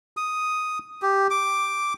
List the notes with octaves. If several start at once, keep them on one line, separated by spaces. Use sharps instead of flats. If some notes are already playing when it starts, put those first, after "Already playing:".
D#6
G4
D6